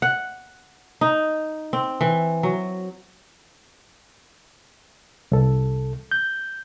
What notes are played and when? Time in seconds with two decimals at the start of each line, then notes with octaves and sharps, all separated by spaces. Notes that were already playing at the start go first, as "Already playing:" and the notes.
0.02 F#5
1.01 D#4
1.73 C4
2.01 E3
2.43 F#3
5.32 C2 A4
6.12 G6